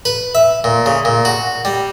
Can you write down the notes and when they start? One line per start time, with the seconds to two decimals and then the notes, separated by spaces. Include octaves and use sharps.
0.05 B4
0.35 E5
0.64 A#2
0.86 C#3
1.05 A#2
1.25 F#4
1.65 G3